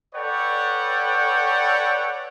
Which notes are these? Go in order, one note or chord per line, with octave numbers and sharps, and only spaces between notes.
A4 B4 C#5 D5 F#5 G5